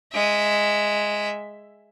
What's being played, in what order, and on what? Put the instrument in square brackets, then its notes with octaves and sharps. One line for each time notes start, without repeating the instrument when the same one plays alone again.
[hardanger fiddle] G#3 E5